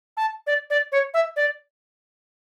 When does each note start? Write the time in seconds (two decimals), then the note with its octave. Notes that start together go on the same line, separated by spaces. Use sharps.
0.17 A5
0.47 D5
0.70 D5
0.92 C#5
1.14 E5
1.36 D5